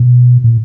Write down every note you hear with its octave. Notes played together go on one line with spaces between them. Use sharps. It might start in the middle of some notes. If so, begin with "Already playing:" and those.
Already playing: B2
A#2